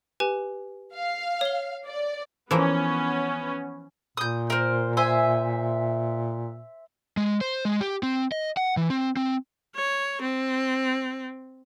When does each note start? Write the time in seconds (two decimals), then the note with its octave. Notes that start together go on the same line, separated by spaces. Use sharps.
0.20 G4 B4 G#5
0.93 F5
1.41 C#5 G7
1.85 D5
2.51 E3 F3 A#3 B3 C#4
4.17 A#2 D#6 G6
4.50 A#4 C5
4.97 C5 E5 G#5
7.17 G#3
7.41 C5
7.65 G#3
7.81 G4
8.03 C4
8.32 D#5
8.57 F#5
8.77 E3
8.90 C4
9.17 C4
9.76 C#5
10.22 C4